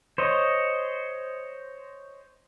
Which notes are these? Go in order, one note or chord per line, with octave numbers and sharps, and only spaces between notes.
C5 C#5 D#5